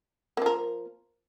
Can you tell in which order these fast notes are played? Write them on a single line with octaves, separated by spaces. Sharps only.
A#3 F3 A#4